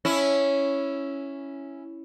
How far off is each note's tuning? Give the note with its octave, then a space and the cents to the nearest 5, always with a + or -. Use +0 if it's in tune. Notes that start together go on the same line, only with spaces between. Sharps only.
C#4 +0 E4 +0